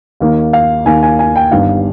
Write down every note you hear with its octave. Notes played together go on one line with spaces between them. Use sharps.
D#2 D#3 A#3
F5
D#2 D#3 A#3 G#5
G#5
G#5
G5
G1 G2 D#3 G3 F5